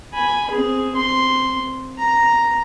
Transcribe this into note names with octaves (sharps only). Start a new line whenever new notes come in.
G#5 B5
C4 G#4
C4 C6
A#5